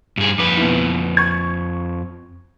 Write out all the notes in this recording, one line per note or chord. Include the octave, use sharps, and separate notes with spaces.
G2 G#4
F2 B4 D6
B2 E3
C#6 G#6